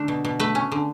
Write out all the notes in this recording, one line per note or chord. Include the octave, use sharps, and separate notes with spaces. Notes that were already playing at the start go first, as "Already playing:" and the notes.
Already playing: D3 A3 D4
B2
B2
A3 B4
C#4
D3